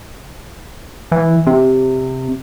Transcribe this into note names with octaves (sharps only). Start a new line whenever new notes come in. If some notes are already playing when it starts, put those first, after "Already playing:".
E3
C3